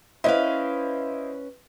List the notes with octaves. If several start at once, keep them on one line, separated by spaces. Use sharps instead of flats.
C#4 E4 B4 C5 D#5 F5